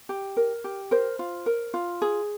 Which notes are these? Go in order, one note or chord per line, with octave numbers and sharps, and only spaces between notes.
G4
A#4
G4
A#4 C5
F4
A#4
F4
G#4